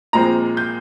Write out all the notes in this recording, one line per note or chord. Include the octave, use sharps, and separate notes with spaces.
A#2 F3 G#3 C4 A#5
G6